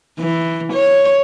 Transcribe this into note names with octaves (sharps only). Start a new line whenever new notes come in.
E3
C#5